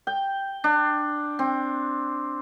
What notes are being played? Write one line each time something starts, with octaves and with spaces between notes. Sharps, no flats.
G5
D4
C4